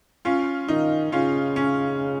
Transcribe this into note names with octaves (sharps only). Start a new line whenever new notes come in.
C#4 F4
D#3 D#4
C#3 C#4 F4
C#4